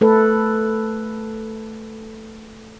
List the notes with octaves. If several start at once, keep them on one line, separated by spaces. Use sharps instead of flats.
A3 A4 B4